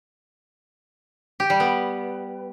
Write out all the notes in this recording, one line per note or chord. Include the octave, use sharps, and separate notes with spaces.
G4
G3
B3